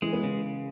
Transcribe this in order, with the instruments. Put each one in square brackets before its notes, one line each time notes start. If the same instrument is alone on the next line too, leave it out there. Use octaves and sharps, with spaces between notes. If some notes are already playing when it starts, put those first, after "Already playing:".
[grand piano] E3 [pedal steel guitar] G#3
[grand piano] B3
[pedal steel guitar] C#3